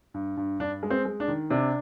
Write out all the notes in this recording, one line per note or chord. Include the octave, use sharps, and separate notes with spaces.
G2
G2
G2 D4
G#3
C4
G#3
D4
D#3
C3 D4